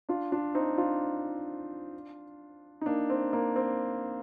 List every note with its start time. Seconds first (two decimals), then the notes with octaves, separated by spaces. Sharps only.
0.09 D4 F4
0.32 D4 F4
0.55 C4 D#4
0.78 D4 F4
2.81 D#4
2.86 A#3 D4
3.10 C4
3.33 A#3
3.56 C4